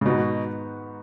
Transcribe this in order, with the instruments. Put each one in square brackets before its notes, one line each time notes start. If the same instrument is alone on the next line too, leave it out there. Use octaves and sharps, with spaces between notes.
[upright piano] C#3
[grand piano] G#2 D#3 B3 D#4 F#4 [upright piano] B2